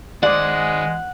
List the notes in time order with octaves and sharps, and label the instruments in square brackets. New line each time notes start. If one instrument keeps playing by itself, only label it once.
[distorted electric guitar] D#3 C5 [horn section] G#3 [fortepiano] D5 D6 [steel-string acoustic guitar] F#5